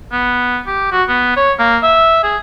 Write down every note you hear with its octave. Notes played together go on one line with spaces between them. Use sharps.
B3
G4
F#4
B3
C#5
A#3
E5
G#4